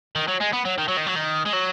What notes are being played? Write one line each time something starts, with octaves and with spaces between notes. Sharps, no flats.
D#3
F#3
G#3
B3
F#3
D#3
F#3
D#3
F#3
D#3
G#3
F#3